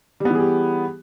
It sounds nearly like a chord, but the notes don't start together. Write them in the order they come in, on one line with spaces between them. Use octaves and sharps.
G3 B3 E3 G#4 G4